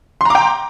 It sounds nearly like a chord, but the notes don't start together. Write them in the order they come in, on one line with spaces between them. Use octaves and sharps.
C6 A#5 D6 G5